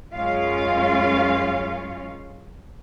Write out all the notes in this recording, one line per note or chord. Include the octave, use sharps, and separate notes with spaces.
F#2 G#3 C#4 F4 F5